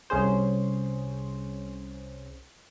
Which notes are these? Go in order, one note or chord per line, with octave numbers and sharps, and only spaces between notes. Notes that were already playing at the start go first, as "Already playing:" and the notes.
C2 C#4 G#4 C5